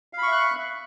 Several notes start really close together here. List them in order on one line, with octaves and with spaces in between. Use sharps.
F5 B5 C#6 E5 F#6